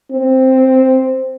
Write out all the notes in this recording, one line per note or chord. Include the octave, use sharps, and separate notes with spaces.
C4